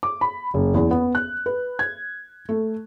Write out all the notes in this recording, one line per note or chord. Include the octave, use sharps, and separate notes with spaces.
D6
B5
F#1
E2
B3
F#6
B4
G#6
A3